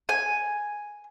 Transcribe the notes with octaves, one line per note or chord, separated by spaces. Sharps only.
G#5